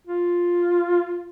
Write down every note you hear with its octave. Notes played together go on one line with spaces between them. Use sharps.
F4